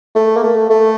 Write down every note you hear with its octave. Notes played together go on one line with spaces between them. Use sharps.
A3
A#3
A3
A3